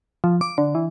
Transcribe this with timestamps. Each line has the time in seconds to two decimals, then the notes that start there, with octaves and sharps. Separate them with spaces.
0.24 F3
0.41 D6
0.58 D3
0.75 E3